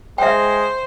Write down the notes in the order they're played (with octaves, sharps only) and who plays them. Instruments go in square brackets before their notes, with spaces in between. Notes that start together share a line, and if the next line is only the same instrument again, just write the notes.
[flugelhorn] G#3 [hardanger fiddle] C5 [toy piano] E5 G5